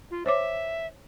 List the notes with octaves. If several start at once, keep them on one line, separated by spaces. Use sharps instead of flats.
F4
C5 C#5 E5 D6